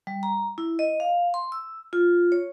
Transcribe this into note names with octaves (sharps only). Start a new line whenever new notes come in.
G3
A#5
E4
D#5
F5
C6
E6
F4
C#5